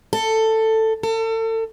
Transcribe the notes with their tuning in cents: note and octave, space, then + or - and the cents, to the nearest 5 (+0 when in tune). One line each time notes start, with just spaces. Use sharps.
A4 +10
A4 +35